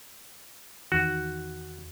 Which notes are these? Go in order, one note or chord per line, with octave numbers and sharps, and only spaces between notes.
E2 D#3 F#4